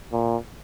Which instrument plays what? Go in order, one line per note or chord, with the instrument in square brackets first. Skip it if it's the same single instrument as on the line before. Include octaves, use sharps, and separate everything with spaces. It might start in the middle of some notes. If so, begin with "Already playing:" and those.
[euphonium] A#2